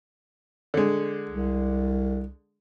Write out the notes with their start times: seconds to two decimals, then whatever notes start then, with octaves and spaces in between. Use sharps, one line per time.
0.74 D3 G#3
1.30 C2